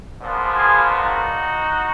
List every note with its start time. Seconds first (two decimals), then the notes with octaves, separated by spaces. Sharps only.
0.21 A#2 F3 G#3 B3
0.54 F4 G#4
0.88 D#4 F#4